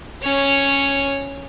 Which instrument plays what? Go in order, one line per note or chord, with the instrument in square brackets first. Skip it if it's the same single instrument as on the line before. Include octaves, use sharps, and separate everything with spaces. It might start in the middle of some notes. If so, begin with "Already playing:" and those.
[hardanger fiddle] C#4 C#5